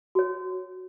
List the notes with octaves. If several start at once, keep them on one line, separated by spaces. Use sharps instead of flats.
F#4 C#5